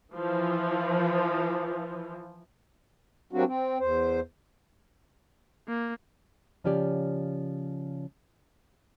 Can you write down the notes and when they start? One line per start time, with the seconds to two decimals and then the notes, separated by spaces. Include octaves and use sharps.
0.14 E3 F3
3.33 F#3 G3 A#3 C4 D4 F#4
3.46 C4
3.80 E2 C5
5.68 A#3
6.64 C#3 F3 C#4 G4 D5